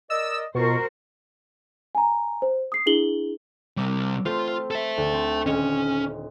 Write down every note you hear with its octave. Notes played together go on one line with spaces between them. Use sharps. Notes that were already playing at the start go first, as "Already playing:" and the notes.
A#4 D5 D#5 E6
B2 F4 F#4 A#4 C5 C#6
G#5 A#5
C5
D#6 C7
D4 E4 G#4 F#7 G7
C3 G3 D6 E6
A3 C4 F4 C5
A4 E5
D2
C4
D#1 C#4 D#5 E7